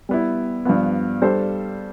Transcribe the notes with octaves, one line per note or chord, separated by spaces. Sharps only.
G3 B3 E4
G2 F3 B3
G3 D4 A4 C5